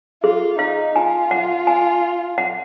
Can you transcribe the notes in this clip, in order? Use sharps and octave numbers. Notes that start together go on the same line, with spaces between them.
F4 G#4
D#4 F5
F4 G#5
F#5
G#5
F#5